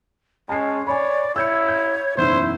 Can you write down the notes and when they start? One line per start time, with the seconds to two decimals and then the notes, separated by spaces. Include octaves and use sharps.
0.49 G#3 C#4 A5 C7
0.87 C#5 D5 G#5 B5
1.36 E4 C#5 E6 G6 C#7
1.68 G6
2.17 F#1 B1 E2 E4 C5